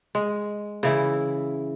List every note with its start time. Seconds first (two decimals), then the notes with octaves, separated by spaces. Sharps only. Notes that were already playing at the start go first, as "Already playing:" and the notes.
0.15 G#3
0.83 C#3 E3 E4